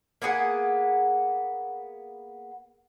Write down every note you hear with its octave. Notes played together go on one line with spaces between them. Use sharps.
A#3 B3 G#4 F#5